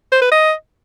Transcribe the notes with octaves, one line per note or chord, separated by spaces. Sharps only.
C5
B4
D#5